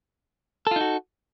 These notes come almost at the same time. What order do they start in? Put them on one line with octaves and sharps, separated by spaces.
A4 F4 D#4 F#4